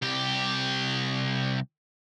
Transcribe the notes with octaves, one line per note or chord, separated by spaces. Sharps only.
C2 G4